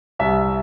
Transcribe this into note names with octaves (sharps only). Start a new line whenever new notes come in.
C2 E5